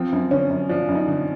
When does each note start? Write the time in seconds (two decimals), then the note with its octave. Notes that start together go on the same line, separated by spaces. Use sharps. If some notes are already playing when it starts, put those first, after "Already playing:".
Already playing: F3 C4
0.12 F#2
0.31 D3 C#4
0.50 F#2
0.69 F3 D4
0.88 F#2
0.95 D#4
1.07 D3